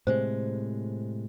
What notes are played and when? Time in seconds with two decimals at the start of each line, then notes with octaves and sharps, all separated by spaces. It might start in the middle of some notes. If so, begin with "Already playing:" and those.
0.07 A2 C3 G#3 C5